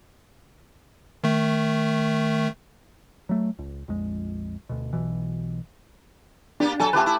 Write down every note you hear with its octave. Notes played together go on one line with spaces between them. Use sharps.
D#3 A3
F#3 A3
C#2
A#1 F2 G#3
D2 B2
B1 B2 E3
A#3 B3 D4 G4
F#3 A4 G#5 A5
C#3 A3 F4 G4 B4
E4